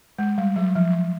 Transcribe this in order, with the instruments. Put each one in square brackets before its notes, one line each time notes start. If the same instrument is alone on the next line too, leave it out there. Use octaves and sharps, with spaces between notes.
[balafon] G#3
G3
F#3
F3